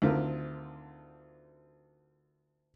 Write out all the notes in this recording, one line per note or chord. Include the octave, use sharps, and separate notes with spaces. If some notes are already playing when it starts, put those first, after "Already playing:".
D2 D3 D#3 C4 F4 A#4